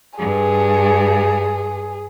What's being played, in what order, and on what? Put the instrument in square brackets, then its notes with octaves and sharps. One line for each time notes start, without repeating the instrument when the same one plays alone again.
[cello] G2 [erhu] G#4